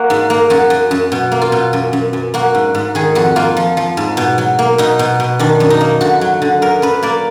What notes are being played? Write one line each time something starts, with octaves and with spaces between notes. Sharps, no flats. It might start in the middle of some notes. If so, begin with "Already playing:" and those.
Already playing: A#3 F#4
G#2
A#3
F#2 F#4
F#2
F#2
B2
A#3
F4
B2
F#2
F#2
F#2
A#3 F#4
G#2
G#2
D#3 G#4
F2 F#4
A#3 F4
F3
F3
G#2
B2
F#3
A#3
B2 D#4
B2
B2
D#3 D4
F#2
D#4
A#3
D3 F#4
F#3
D3
F#2 A#4
F#2 B4
A#3 D5